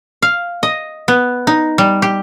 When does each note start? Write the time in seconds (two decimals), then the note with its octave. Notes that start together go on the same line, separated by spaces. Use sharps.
0.22 F5
0.63 D#5
1.08 B3
1.47 D#4
1.78 G3
2.02 G4